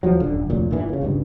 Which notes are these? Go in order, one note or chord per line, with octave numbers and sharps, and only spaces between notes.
D#2 F3 F#3
D#1 F#2 D3
F1 D2 A#2 F#3
G1 G2 A#2 E3
A#2 C#3
G#1 C#2 G2